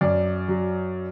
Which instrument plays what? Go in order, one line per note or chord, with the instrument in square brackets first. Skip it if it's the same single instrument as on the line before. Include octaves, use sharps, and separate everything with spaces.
[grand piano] F#2 D5
F#3